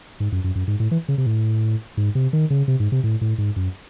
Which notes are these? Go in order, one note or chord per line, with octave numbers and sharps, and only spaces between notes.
G#2
F#2
F#2
F#2
G#2
A2
E3
C#3
C3
A2
G#2
C3
D#3
C#3
C3
G#2
C3
A2
A2
G#2
F#2